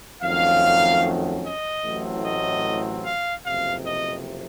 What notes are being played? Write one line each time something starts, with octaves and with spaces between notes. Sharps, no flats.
F2 D#3 F#3 A3 C#4 F5
D#5
A1 A2 F#3 C4
D#5
F5
F#1 F2 C3 F5
D#5